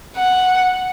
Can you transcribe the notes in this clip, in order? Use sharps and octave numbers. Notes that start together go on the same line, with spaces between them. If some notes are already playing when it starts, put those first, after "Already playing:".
F#5